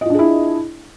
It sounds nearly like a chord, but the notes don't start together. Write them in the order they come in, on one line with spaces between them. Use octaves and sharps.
D#5 F4 D4 G#4 E4